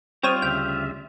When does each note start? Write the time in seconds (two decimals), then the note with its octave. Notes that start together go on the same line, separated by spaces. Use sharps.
0.23 G3 C4 F4 C#5 D#6
0.42 D2 C#3 E5 G5